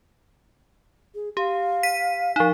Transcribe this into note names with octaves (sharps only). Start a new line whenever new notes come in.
G#4
G4 F5
B6 D#7
F3 D#4 F5